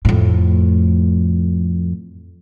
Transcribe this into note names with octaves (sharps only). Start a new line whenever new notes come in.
F2 A2